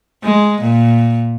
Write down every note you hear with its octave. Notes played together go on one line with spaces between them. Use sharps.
G#3
A#2